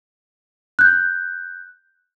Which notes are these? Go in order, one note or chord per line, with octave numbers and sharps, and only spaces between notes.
F#6 G6